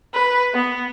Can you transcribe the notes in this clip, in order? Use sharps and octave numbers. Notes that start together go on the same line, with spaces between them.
B4
B3